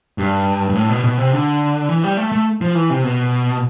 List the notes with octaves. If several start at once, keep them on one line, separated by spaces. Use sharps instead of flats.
G2
G2
A2
B2
B2
C3
D3
E3
G3
A3
A3
F3
E3
C3
B2